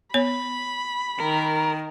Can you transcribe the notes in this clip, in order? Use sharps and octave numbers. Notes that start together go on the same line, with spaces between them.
B3 C#5 B5
D#3 A#4